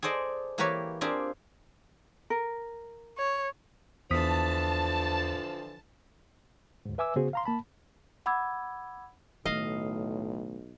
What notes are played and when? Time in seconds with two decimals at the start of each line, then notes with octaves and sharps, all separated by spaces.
0.02 G#4 A4 C5 D5 D#5
0.58 E3 A#3 G4 A#4 B4 C#5
1.01 A#3 C4 D4 F4 G4 G#4
2.30 A#4
3.18 C#5
4.11 E2 D3 E3 F3 A5 D#6 B6
6.85 D2 G#2
6.98 B4 E5 G#5 D6 E6
7.16 C#3 B3 F#4 G#4 C5
7.33 F5 A#5 C6
7.45 A#3 A5 B5
8.26 F#5 B5 D6 E6 G#6
9.45 B1 A2 D#3 A3 D#5 F5